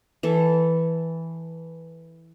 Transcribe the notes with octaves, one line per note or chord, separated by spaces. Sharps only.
E3 A4